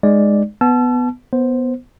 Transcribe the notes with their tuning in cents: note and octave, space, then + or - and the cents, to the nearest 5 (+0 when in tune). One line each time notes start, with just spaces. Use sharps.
G#3 +0 D#4 -25 D5 +0
B3 +5 A5 -20 E6 +40
B3 +0 C5 +0